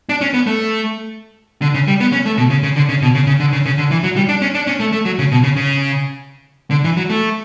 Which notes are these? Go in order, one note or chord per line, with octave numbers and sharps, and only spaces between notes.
D4
C#4
B3
A3
D3
C#3
G3
B3
C#4
A3
B2
C#3
C#3
D3
C#3
B2
C#3
C#3
D3
C#3
C#3
D3
E3
F#3
G3
D4
C#4
D4
C#4
A3
A3
F#3
C#3
B2
C#3
C#3
D3
E3
F#3
A3